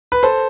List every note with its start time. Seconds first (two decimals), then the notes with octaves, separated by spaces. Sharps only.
0.12 B4
0.23 A4 C5